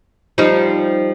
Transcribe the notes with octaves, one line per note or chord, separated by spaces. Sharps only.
F3 G3 D#4